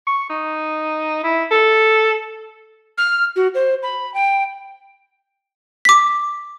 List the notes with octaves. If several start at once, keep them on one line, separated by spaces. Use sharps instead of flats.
C#6
D#4
E4
A4
F6
F#4
C5
B5
G5
D6 B6